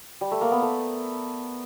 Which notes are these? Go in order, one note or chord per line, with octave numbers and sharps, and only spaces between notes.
G3
A3
A#3
B3
A3